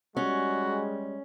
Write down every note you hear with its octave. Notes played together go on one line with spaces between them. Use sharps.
G3 G#3 C#4 F#4